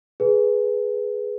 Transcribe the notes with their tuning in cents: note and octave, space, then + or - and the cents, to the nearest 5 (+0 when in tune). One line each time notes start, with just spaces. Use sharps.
G#4 +5 B4 +0